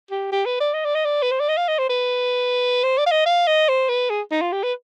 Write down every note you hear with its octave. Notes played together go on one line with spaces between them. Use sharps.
G4
G4
B4
D5
D#5
D5
D#5
D5
B4
C5
D5
D#5
F5
D#5
C5
B4
C5
D5
F5
D#5
F5
D#5
C5
B4
G#4
D#4
F4
G4
B4